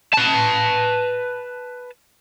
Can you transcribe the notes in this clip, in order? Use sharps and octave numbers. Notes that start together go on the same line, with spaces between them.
B4 A5